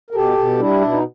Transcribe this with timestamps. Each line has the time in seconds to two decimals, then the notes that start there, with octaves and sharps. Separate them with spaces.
0.11 A#4
0.15 B2 G4 A4
0.38 B2
0.59 G3 D4 E4
0.81 B2
0.92 D#4